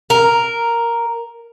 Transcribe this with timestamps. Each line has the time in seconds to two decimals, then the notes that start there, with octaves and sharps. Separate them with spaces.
0.10 A#4